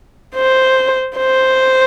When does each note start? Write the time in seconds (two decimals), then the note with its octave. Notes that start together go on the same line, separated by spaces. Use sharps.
0.35 C5
1.17 C5